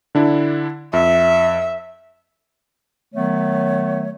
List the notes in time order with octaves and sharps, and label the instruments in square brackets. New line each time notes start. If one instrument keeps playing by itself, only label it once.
[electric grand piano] D3 D4 E4
[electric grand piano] F2 [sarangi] E5
[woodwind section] D#3 F#3 A3 B3 C#5